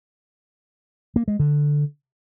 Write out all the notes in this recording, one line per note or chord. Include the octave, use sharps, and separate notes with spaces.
A#3
G#3
D3